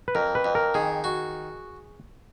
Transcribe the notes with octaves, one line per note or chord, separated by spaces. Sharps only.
B4
F2 A#4
B4
F2
A#4
D#3 G#4
F#4